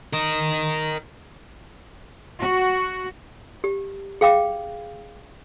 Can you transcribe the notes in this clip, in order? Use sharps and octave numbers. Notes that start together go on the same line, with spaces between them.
A#4 D#5
F#4
G4
G#4 F5 G5 D6